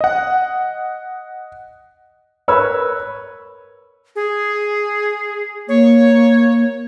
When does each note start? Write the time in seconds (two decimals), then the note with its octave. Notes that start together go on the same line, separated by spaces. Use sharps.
0.01 D#5 F#5
2.48 A#4 B4 C#5 B5 C#6 E6
4.16 G#4
5.69 A#3 C#5